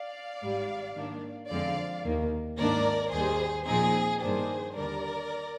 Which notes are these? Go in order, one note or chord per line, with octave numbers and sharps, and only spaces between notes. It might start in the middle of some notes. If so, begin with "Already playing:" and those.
Already playing: D5 F5
G#1 G#2 G3
G#2 D#3 A#3 D4
F2 D3 F3 G#3 C4 D5 F5
D#2 D#3 A#3
G#1 G#2 D#3 A#3 D4 A#4 D5
D#2 D#3 G3 G#4 C5
A#2 F3 C4 D#4 G#4
G2 D#3 A#3 D4 G#4 C5
D#2 D3 G3 D4 A#4 D5